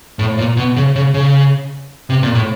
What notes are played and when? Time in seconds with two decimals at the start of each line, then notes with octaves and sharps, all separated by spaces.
0.19 A2
0.38 A#2
0.57 B2
0.76 C#3
0.96 C#3
1.14 C#3
2.10 C3
2.23 A#2
2.35 A2